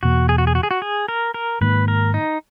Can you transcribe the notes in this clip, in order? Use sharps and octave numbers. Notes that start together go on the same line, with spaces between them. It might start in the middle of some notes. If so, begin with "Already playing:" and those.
E2 B2 A#3 F#4
G#4
F#4
G#4
F#4
G#4
F#4
G#4
A#4
A#4
G#2 D#3 A#3 B4
A#4
D#4